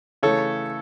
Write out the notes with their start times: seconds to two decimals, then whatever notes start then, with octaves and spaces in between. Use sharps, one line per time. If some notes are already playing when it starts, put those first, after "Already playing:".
0.23 C#3 E3 A3 A4 C#5